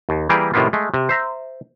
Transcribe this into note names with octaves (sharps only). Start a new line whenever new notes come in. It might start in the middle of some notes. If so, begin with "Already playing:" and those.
D#2
E3 G3 A#3 G4 G#4 A#4
A2 C3 D#3 A#3 B3 F4
G#3 A3
C3
C5 E5 A#5